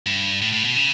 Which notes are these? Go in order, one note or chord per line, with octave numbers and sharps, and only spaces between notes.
G2
A2
A2
B2
C#3